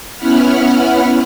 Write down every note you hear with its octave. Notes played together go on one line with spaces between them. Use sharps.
B3 C#4 E4 F#5 B5 F6